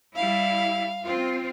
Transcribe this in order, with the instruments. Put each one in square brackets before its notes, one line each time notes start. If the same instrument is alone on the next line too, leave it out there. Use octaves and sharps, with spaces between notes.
[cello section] G3 E4 [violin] F5
[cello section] C4 F4